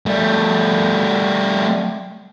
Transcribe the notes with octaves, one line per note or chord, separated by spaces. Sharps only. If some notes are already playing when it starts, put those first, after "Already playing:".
G3 A3